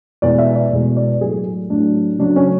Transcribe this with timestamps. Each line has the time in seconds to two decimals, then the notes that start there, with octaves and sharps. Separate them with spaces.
0.22 E2 B2 G#3 D5
0.39 E5
0.55 D5
0.71 E2 B2 G#3
0.97 D5
1.21 A2 F#3 A3 G#4
1.70 A2 F#3 A3 D4
2.19 C#3 F#3 A3 D4
2.36 C#4